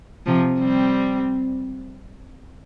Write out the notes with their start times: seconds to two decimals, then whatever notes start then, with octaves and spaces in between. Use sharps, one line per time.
0.26 C3 F3
0.59 G3 C4